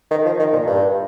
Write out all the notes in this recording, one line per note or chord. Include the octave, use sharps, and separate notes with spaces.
D#3
F3
D#3
A#2
G2